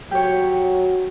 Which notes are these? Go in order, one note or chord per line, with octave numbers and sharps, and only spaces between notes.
F#3 F#4 G4 C#5